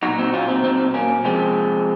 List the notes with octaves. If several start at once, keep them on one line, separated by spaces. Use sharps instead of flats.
A#2 F#3 D#4 F#4
C4 D#4
C#4 F4
C4 D#4
C4 D#4
A#3 C#4
C3 F3 G#3 C4